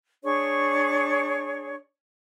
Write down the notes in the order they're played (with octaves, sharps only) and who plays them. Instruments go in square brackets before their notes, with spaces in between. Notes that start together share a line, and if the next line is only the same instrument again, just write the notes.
[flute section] D4 G#4 C#5 C#6